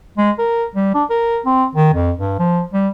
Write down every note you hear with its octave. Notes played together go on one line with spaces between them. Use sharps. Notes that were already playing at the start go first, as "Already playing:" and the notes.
G#3
A#4
G3
D4
A#4
C4
D#3
F2
G2
F3
G3